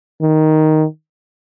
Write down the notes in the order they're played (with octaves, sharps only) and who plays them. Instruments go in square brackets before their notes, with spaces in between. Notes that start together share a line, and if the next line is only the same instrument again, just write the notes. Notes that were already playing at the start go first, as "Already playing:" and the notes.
[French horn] D#3